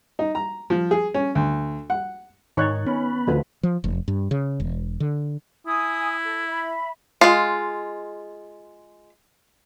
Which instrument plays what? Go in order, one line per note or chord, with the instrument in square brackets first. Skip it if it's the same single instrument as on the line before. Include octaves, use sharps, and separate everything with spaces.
[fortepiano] D#4
A#5
F3
G#4
C#4
D2
F#5
[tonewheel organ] G#2 [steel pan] D#3 D#4 C#5 [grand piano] C#6 F#6 A6
[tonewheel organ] B3 B5 [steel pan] C#4
[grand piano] D2 [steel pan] F3 A3 B4
[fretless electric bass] F3
F1
G2
C#3
E1
D3
[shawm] E4 [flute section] G#5 D#6
[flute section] A4
E5 B5
[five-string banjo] G#3 F4